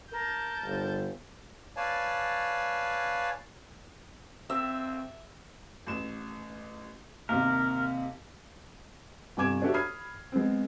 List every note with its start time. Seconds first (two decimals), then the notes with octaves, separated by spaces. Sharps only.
0.12 A#4 A5 G6
0.64 G1
1.77 B4 C#5 D5 F5 G#5 A5
4.50 C4 E5
5.87 A1 E7
7.29 D#2 C3 A#4
9.37 G1 C3 G#5 D6 G#6 E7
9.62 D4 F#4 G4 A4 C#5 E5
9.74 B5 D#6 F6 G#6 C7
10.32 G#3 B3 C4